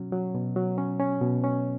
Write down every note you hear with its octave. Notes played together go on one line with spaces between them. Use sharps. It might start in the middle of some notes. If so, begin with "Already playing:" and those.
Already playing: B2 F#3 C#4
F#3
B2
F#3
C#4
C#4
B2
C#4